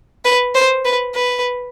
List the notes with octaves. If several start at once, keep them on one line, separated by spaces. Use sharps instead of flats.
B4
C5
B4
B4